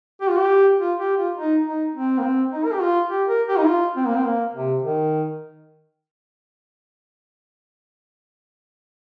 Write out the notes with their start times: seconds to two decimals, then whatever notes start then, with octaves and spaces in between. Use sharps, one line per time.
0.21 G4
0.30 F4
0.37 G4
0.80 F4
0.99 G4
1.17 F4
1.36 D#4
1.65 D#4
1.95 C4
2.18 A#3
2.23 C4
2.52 D#4
2.64 A#4
2.72 G4
2.81 F4
3.10 G4
3.28 A#4
3.48 G4
3.58 D#4
3.66 F4
3.96 C4
4.05 A#3
4.15 C4
4.25 A#3
4.54 C3
4.82 D#3